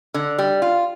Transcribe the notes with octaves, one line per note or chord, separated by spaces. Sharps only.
D3
G3
F4